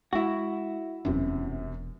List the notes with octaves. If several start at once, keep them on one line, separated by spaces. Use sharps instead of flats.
G#3 E4 F#4
E1 F#2 C3 E3